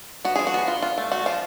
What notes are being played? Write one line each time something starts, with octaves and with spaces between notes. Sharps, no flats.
B3 F#4
F3 G#4
F#4
B3
F4
F4
A3
A3 F#4
F3 F4